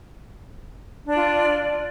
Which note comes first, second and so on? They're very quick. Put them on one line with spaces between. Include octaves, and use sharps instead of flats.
D4 D5 F4